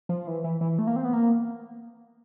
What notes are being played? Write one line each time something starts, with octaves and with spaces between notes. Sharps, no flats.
F3
E3
E3
E3
A3
A#3
C4
B3
A#3